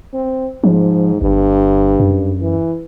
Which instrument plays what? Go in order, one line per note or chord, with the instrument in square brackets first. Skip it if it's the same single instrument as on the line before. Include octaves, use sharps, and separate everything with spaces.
[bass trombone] C4
[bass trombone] G#2 [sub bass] F3
[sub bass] G1 [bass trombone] G2
[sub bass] F#2
[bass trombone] E3